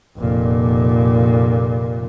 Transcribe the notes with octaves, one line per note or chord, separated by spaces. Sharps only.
F1 A#2